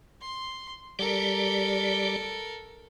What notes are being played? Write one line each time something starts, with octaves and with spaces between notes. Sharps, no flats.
C6
G3 G4 A4 A#4 D5